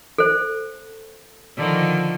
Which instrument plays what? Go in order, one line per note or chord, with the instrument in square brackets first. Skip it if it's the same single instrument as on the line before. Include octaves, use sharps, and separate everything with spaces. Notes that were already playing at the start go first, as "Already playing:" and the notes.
[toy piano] A4 C5
[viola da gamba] D3 D#3 F3